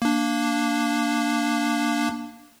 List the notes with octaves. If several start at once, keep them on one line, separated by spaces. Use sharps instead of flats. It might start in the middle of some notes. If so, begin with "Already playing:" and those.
A#3 D4